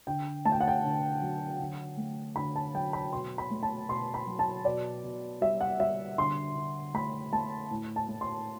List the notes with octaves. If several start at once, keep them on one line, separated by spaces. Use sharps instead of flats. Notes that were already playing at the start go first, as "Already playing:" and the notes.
D3 G5
A3 A5
G5
F#5
G5
D3
F#3
D3
A3
D3 B5
A5
F#3 G5
B5
B2 C6
B5
A3
A5
B2 C6
B5
F#3
A5
B2 D5
B2
G3 E5
F#5
G3 E5
D3 C6
D3
A3 B5
A3 A5
A2
A5
A3
C6